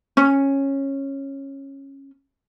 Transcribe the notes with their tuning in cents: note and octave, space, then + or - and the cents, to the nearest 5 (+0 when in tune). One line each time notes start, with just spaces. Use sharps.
C#4 -15